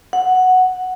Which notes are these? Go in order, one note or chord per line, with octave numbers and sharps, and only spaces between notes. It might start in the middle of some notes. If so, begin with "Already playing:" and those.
F#5